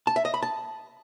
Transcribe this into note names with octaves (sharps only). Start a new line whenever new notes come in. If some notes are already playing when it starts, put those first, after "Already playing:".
A5
E5
D#5
B5
A5